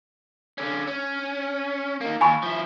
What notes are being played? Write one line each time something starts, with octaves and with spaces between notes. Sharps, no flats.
D3 C#4
C#4
A#3 D#4
D#2 G#5 B5 C#6
F3 E4